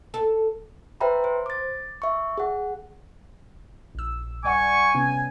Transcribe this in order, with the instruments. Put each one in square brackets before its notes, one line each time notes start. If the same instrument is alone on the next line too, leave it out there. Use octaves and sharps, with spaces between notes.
[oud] A4
[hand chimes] B4 C5 E5 G5 A#5 B5
C5
D6 A6
E5 C#6
G#4 F#5
[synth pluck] A#1 E6
[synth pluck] G2 D5 F#5 [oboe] G#5 [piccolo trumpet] C#6
[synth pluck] C3 B3 C#4